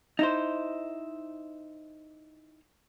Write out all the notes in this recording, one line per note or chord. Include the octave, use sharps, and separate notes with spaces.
D#4 E4 C5